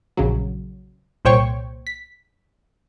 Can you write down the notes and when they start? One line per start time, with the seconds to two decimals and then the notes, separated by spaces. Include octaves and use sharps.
0.17 A#1 C#3 F#3
1.25 C2 A#2 C5 C#5 G5 C#6
1.87 B6